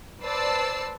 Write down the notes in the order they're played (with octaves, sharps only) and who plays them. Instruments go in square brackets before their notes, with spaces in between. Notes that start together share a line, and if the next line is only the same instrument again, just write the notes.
[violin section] B4 C5 D5 A5 E6 C7